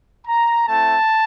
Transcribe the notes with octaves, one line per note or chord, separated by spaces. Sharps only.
A#5
A3 C4 E4 A5